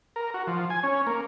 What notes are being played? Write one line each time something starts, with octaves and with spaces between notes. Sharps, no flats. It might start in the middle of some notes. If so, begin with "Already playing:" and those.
A#4
F#4
F3
G#5
C#4
A#3